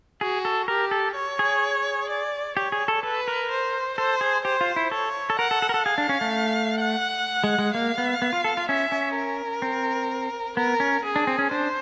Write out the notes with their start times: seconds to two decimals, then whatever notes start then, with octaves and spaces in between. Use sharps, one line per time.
0.21 F#4 G#4
0.45 A4
0.68 G4 A#4
0.91 A4
1.16 C#5
1.39 G#4
2.10 D5
2.57 G4 C#5
2.72 G#4
2.88 A4
3.03 A4 B4
3.28 A#4
3.51 C5
3.98 A4 C5
4.21 G#4
4.45 G4 C5
4.61 F4
4.76 E4
4.91 A4 C#5
5.30 A4
5.39 A#4 F#5
5.51 A4
5.62 A4
5.69 A#4
5.74 A4
5.86 G#4 F5
5.98 D4
6.09 C#4
6.21 A3
6.80 F#5
7.44 G#3
7.59 G#3
7.74 A#3 F5
7.98 B3
8.22 B3
8.33 F4
8.44 A4
8.57 F4
8.69 C#4 E5
8.92 C#4
9.15 A#4
9.62 C4
10.57 B3 A#4
10.80 C#4
11.04 G#4
11.16 D4
11.27 C4
11.39 C#4
11.51 D4 C5